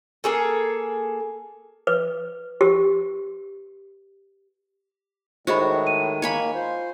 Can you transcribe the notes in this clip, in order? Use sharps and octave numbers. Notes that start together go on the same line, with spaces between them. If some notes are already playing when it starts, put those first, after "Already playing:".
A#3 G#4 A4
B4
G4
A2 D#3 G#3 F#4 G#4 C5 D#5 B5
D#7
A#3 C#5 G#5 B5
F4 C5